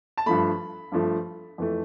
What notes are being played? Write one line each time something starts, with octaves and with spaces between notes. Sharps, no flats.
A5
G2 F3 A3 B5
G2 F3 A3
F2 E3 A3